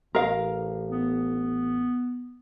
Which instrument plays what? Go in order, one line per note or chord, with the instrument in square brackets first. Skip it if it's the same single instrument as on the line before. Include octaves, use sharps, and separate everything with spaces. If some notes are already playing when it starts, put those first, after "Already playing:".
[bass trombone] A1 [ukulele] A#4 F5
[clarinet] B3